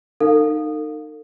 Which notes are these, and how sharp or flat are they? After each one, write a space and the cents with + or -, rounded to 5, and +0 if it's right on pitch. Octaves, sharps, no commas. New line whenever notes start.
D#4 -25 A4 +45 F5 +15